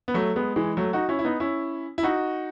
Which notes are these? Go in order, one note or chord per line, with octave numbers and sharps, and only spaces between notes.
B3
F#3 A3
G#3 B3
E3 G#3
F#3 A3
D#4 F#4
C#4 E4
E4
B3 D#4
C#4 E4
E4
D#4 F#4